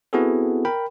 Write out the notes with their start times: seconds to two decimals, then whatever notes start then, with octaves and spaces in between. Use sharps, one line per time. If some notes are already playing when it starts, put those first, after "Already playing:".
0.13 B3 C4 E4 F#4 G#4 A4
0.65 A#4 G5 B5